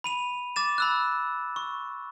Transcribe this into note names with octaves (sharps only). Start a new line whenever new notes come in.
B5 D#7 F7
D6 A6 E7
B5 E6 F#6
C#6